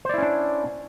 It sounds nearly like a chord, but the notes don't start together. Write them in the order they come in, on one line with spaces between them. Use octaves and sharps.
C5 D5 E4 C#4 D4